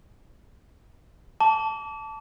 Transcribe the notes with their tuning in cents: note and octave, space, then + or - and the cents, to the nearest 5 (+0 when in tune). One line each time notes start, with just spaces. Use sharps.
A5 +0 D6 -35